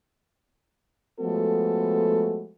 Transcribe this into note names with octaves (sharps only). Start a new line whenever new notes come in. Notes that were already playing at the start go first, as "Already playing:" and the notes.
F3 G#3 A3 B3 F#4 A4